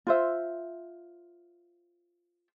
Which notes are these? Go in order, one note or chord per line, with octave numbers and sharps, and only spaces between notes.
F4 C5 E5